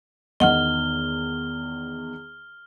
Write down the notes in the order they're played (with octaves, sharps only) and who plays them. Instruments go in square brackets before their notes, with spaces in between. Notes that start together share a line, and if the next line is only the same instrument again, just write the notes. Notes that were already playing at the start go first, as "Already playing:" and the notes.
[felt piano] E2 D#3 [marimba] D#5 F#5 [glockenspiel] F6 G7